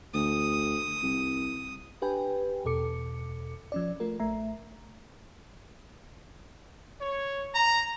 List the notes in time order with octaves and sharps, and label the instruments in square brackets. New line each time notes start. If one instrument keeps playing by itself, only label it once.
[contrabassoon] D2 [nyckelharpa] D#6
[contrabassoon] C2
[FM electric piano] D4 G4 B4 G5 G#5
E2 B2 A4 D6 C#7
F3 C#4 D5
A3 F4 A#4
A1 A3 E5 A#5
[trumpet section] C#5
A#5